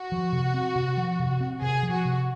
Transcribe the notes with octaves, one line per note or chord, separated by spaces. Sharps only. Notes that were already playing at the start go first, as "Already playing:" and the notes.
Already playing: F#4
F3
C3
C4
C3
F3
C3
C4
C3 G#4
F3
F#4
C3